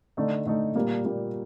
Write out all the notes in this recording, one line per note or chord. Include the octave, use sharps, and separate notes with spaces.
D3 A3 D#4
D3 A3 D#4
A#2 G3 A#3
A#2 G3 A#3